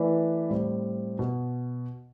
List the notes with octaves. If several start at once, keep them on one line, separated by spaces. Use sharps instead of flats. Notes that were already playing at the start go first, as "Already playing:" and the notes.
Already playing: E3 A3 E4 B4 D5
A2 G3 C4
B2